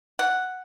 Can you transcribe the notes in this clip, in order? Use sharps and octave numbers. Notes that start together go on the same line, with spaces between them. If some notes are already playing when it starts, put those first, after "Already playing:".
F#5